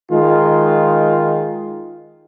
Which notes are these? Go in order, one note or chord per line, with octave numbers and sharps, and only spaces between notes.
D#3 G#3 F4